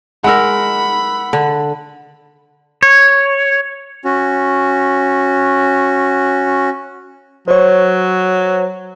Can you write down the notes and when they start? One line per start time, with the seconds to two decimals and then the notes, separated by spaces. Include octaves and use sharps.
0.24 G#3 D#4 A#4 F#5 B5 E6
1.33 D3
2.83 C#5
4.05 C#4 F#4
7.48 F#3 C5 C#5